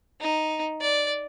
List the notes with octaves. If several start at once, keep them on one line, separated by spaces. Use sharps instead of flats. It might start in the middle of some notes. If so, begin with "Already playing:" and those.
D#4
D5